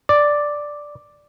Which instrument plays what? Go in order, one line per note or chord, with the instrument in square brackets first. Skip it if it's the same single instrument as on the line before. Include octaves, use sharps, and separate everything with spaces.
[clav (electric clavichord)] D5